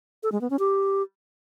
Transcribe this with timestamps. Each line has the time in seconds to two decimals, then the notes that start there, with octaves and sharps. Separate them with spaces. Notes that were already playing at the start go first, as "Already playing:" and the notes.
0.23 A4
0.32 G#3
0.41 B3
0.50 C#4
0.59 G4